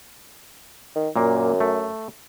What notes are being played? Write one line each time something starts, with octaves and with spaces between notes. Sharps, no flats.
D#3
F#2 A#2 A#3
A3